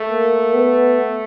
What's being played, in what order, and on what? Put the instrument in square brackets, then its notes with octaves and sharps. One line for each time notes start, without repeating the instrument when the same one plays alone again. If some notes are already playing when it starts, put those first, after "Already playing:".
Already playing: [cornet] A3
[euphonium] A#3
B3